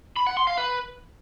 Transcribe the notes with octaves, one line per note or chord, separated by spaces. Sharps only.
B5
F#5
C6
F5
B4